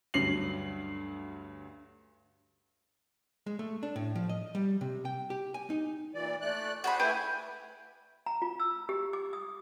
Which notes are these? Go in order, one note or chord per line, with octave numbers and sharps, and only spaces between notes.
D2 G2 F#3 C7 F#7
G#3
A3
D4
A2
F3
D#5
G3
C3
G5
G4
G#5
D#4
A#2 E3 D5
A3 D5 F#6
F#4 G#4 C5 B5
A3 E4 G4 G#4 B4 G#5
A#5
F4
E6
G4
D6
D#6